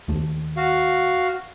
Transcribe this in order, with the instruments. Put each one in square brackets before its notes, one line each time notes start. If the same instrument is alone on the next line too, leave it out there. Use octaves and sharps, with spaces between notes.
[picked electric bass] D#2 A3
[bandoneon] F#4 F5